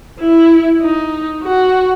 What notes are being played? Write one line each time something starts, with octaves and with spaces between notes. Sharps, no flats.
E4
D#4
F#4